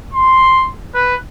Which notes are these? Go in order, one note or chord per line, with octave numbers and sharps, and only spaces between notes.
C6
B4